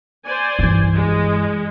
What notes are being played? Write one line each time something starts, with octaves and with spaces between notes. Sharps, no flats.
C5 D5 G#5
G2 E3
G#3